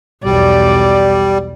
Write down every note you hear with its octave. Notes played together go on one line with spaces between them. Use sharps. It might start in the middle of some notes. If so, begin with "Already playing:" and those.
B1 E2 G3 D5